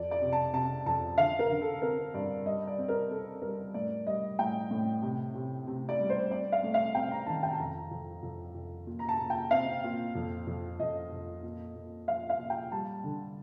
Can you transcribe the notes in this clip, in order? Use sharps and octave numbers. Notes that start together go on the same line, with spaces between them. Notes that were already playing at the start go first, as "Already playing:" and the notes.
Already playing: F2 D5
D5
C3
A5
C3 A5
F2 A5
D3 F5
A#4
D3
A4
C4 A#4
G2 D5
G3 D#5
D5
C4
A#4
C4 A4
G3 A#4
A2 D5
G3 D#5
A2 G5
A2
C3
C3
C3
D5
G3
C5
C4 D5
F5
A3
F5
C4 G5
A#5
D#3 A5
G5
A5
F2 A#5
F2
F2
F2
A#2
A#5
A5
A#2
G5
C4 F5
A#2
F2
F2
F2 D#5
F2
A#2
A#2
F3 F5
F5
A#2
G5
G3 A5
D3